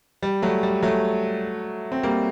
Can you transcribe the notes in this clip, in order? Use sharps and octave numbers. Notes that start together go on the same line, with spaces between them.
G3
F#3 A3
G3
F#3 A3
C4
G3 A#3